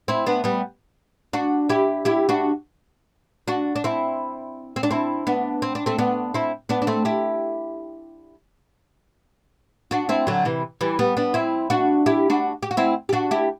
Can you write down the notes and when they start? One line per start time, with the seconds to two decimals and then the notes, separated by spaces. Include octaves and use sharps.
0.08 C4 E4
0.26 B3 D4
0.44 G3 B3
1.33 D4 F#4
1.69 E4 G4
2.05 E4 G4
2.29 D4 F#4
3.48 D4 F#4
3.76 D4
3.84 C4 E4
4.76 C4
4.83 D4
4.91 C4 E4
5.27 B3 D4
5.62 C4
5.75 D4
5.86 A3 C4
5.99 B3 D4
6.34 C4 E4
6.69 B3 D4
6.82 D4
6.87 A3 C4
7.05 E4 G4
9.91 D4 F#4
10.09 C4 E4
10.27 D3 F#3
10.45 C3 E3
10.81 E3 G3
10.99 G3 B3
11.17 B3 D4
11.34 C4 E4
11.70 D4 F#4
12.06 E4 G4
12.30 D4 F#4
12.63 G4
12.71 F#4
12.77 C4 E4
13.09 G4
13.13 D4 F#4
13.31 E4 G4